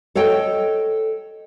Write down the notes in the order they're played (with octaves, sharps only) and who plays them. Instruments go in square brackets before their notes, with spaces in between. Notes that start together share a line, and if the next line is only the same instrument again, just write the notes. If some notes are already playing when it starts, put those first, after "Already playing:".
[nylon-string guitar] A4 C#5 D#5 G5